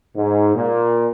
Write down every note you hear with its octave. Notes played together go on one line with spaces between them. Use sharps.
G#2
A#2